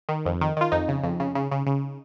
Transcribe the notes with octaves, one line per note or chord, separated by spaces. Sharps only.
D#3
F2
D#3
D#3 F4
F2 D#4
C#3
F2
C#3
C#3
C#3
C#3